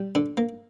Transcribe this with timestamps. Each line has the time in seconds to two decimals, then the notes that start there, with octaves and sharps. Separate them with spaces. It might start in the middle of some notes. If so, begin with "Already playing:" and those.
Already playing: G3
0.15 D3
0.37 A#3